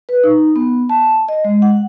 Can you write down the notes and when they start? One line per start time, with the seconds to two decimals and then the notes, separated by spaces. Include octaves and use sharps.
0.09 B4
0.24 D#4
0.56 B3
0.89 A5
1.29 D#5
1.44 G#3
1.62 F#5